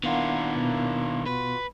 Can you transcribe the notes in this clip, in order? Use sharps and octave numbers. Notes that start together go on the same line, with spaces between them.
D#3 A#3 B3 D4 E4 F4 F5 F#5
B2 B3
F4 F#4 B4